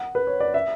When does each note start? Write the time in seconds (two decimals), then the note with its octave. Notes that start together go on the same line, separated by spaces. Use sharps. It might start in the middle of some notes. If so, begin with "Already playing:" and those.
Already playing: F#5
0.15 B4
0.27 C#5
0.40 D5
0.54 E5